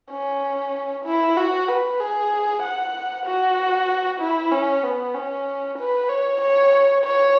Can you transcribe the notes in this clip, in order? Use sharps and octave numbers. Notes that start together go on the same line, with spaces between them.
C#4
E4
F#4
B4
G#4
F#5
F#4
E4
C#4
B3
C#4
B4
C#5
C#5
C#5